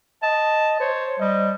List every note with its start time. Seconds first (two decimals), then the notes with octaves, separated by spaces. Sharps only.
0.22 D#5 A5
0.80 C5 C#5
1.19 G3 D#5